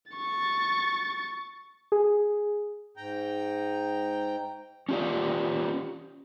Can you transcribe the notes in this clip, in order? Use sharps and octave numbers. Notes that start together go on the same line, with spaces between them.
C#6 A6
G#4
G#2 G5 A#5
C#4 F4 G4 D5